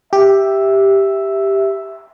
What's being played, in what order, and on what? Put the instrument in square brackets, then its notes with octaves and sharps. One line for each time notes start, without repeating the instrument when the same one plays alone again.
[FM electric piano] G4 [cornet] E5